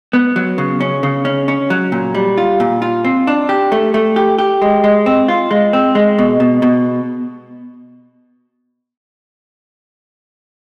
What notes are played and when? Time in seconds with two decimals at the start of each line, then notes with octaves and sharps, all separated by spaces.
0.13 B3
0.36 F#3
0.58 C#3
0.81 C#4
1.03 C#3
1.25 C#4
1.48 C#4
1.70 F#3
1.92 A#2
2.15 G3
2.38 F4
2.60 A#2
2.82 F4
3.05 C4
3.27 D4
3.49 G4
3.72 A3
3.94 A3
4.16 G4
4.39 G4
4.62 G#3
4.84 G#3
5.06 C4
5.28 F4
5.51 G#3
5.73 C4
5.95 G#3
6.18 B2
6.40 B2
6.62 B2